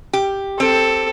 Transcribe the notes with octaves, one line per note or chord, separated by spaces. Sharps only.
G4
C4 A4